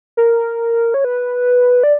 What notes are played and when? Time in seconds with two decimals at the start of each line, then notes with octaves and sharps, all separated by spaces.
0.17 A#4
0.94 C#5
1.05 B4
1.83 D5